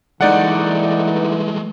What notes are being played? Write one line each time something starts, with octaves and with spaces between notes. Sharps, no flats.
E3 G#3 A3 D#4 D5 F#5